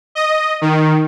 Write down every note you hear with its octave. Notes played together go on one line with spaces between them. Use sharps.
D#5
D#3